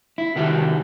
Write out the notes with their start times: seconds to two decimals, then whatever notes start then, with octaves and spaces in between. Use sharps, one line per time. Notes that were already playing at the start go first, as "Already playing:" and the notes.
0.18 E4
0.36 C3 D#3 E4 F#4 G4